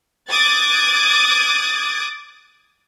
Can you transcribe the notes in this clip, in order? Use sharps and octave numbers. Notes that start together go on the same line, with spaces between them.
D6 D#6 F#6 G#6 A6